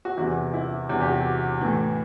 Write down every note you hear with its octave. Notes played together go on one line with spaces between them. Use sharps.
F#4
E2 C3 E3 E4
E4
E2 C3 E3 F#4
G4
F#4
A2 E3